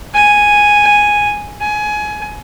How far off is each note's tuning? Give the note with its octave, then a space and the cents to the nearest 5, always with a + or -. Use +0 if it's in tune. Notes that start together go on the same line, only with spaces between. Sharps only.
G#5 +0
G#5 +20